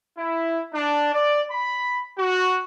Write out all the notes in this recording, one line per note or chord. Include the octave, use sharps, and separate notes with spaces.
E4
D4
D5
B5
F#4